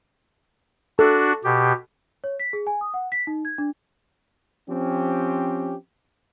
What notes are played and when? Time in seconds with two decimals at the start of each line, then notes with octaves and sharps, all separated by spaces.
0.99 D4 F#4 A4
1.44 B2 G4
2.24 C#5
2.40 B6
2.53 G#4
2.67 G#5
2.81 D#6
2.94 F#5
3.12 B6
3.27 D#4
3.45 G#6
3.58 D4
4.69 F3 C4 C#4 G4